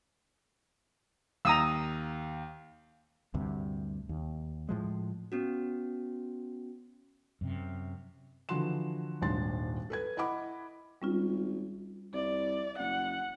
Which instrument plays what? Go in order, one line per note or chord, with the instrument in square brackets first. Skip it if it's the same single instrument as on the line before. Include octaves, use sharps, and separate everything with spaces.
[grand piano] D#2 [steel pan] A#5 D#6 E6
[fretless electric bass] D2 G2 C3
D#2
A2 F3 G#3
[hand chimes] B3 C#4 F#4
[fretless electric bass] F#2 C3
[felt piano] D3 E3 F3 F#4 C6 E7
D#1 G#1 D4 C6 A6
A4 B4 G#6
E4 D#5 F#5 B5 D6
[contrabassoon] G#1 [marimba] G3 C#4 F4
[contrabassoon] C2 [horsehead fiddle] D5
[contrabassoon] F#1 [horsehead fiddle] F#5